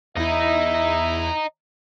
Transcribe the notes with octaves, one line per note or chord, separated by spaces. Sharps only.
E2 E4 D#5 E5 A#5